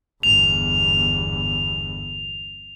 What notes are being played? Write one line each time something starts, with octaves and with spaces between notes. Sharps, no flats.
G1 E2 F7